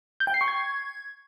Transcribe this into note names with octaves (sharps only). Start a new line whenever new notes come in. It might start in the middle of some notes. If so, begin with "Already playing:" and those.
G6
G5
C7
C#6
G#6